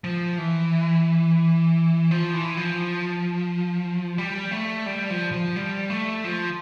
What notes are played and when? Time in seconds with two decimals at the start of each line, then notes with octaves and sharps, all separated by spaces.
0.04 F3
0.38 E3
2.11 F3
2.33 E3
2.57 F3
4.18 G3
4.51 A3
4.86 G3
5.10 F3
5.32 F3
5.56 G3
5.90 A3
6.24 F3